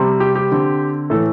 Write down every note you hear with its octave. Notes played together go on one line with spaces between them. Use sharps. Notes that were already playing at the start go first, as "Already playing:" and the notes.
Already playing: C3 G3 C4
G4
G4
D3 C4
A2 E3 A3 A4